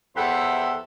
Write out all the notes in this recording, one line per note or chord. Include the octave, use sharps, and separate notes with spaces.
E2 G4 A4 C5 E5 F#5